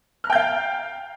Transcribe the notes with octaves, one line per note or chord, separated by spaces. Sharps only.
F5 G5 A#5 F6 G6